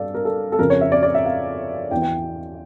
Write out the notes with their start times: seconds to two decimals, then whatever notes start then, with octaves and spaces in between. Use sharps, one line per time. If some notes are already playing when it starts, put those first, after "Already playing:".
Already playing: G2 A4 D5 F5
0.14 A#4
0.25 A4
0.52 A4
0.59 F2 C#3 F3 A#4
0.70 C#5
0.81 E5
0.92 D5
1.03 D5
1.15 E5
1.26 F5
1.91 E2 E3 G5
2.02 G5